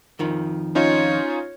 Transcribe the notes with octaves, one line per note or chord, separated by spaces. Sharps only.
F2 D#3 F3
C#4 D#4 F4 C#5